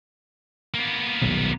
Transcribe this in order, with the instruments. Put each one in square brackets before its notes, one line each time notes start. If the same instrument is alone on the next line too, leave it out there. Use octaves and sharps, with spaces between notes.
[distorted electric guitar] A#3 B3
[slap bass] D#1 B1 A#2